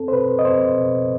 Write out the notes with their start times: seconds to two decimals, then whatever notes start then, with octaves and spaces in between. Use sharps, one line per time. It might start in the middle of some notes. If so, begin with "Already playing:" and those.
Already playing: C4 A4
0.08 C5
0.12 B2 B4
0.39 D#5
0.45 C4 C5
0.78 B2